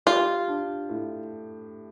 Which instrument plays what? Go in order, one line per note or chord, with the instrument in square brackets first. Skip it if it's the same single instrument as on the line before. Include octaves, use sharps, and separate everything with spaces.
[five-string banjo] F4 [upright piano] G4
[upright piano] D4
A2